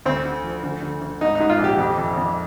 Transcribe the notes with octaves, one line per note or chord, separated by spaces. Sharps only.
D2 C4
D3
F3
D2
D3
D2
G#2 D#4
G#2 D#4
F4
A#1
G4
F2 G4
F2
F2